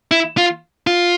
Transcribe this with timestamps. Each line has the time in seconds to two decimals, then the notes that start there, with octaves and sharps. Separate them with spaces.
0.11 E4
0.37 F4
0.87 F4